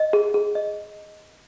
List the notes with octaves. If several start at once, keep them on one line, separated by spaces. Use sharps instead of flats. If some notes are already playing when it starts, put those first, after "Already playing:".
Already playing: D#5
G#4
G#4
D#5